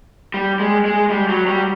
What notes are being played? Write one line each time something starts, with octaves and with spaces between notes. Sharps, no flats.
G3
G#3
G#3
G3
F#3
G3